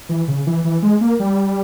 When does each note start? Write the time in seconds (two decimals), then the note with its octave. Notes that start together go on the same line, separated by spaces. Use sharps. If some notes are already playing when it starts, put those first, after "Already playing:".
0.09 E3
0.28 C#3
0.47 E3
0.64 E3
0.83 G#3
1.01 A#3
1.20 G3